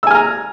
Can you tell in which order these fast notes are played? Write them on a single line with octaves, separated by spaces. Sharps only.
E6 G#5 F6 A#5